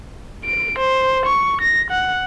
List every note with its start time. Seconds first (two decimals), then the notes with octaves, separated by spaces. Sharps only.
0.45 D7
0.79 C5
1.26 C#6
1.61 A#6
1.91 F#5